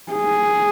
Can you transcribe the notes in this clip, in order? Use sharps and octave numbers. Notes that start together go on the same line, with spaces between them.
G#4